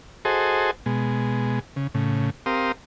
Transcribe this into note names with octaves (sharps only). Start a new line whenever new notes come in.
F#4 G#4 A4 C5 D#5
B2 G#3
C#3
A2 C#3
C4 G4 A#4 F5 C6 D#6